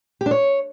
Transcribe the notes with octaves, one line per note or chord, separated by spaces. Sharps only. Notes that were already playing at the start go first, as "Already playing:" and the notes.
G4
D4
C#5